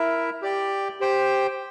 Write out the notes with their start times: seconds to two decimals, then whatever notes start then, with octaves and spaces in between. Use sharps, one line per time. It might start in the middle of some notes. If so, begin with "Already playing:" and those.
Already playing: E4 A#4 E5
0.42 G4 D5 G5
1.00 G4 C5 G5